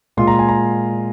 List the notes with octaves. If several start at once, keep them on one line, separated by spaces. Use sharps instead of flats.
A#2 G#3 F4 C6
A#5
G#5
A#5